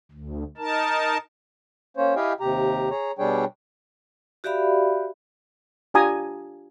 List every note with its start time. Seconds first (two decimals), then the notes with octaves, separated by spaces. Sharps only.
0.12 D2
0.58 D#4 A#4 A5
1.97 A#3 C#4 C5 C#5
2.16 E4 G4 D#5 F5 G5 G#5
2.40 D#2 C3 G4 A#5
2.90 G#4 C#5 A#5
3.19 B2 G3 D4 G#4 C#5 G5
4.44 F#4 G4 D5 E5 F5 B5
5.94 D4 F4 G4 G#5 A#5 D#6